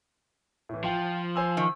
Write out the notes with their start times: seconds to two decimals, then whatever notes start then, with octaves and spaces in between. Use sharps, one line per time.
0.69 A2 E3
0.84 F3 F4 G5
1.36 C5 G#5 E6
1.57 D#3